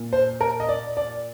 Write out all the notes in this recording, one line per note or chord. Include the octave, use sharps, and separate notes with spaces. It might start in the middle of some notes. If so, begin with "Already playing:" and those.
Already playing: A#2
C5
A#4
D#5
D5
D5